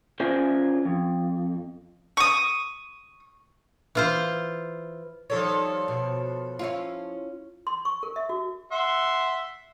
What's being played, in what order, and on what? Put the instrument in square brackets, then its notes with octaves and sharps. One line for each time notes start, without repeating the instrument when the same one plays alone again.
[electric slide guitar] C#4 F4 G#4 A#4 C5 D5
F2
[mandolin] C#6 D#6
[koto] E3 F4 C5
[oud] D#3 G3 [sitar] F3 A4 C#5
[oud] B2
C#4 E4 F4
[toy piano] C6
C#6
A#4
E5
F#4
[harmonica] E5 F#5 C6